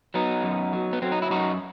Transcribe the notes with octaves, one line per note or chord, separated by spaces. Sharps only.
F#3 B3 D#4
F#2
F#3
B3
F#3 C4
D#4
E4
F#2 D#4 F#4